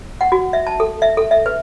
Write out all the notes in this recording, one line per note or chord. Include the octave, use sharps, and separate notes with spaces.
F#5
F#4
E5
A5
A4
E5
A4
E5
B4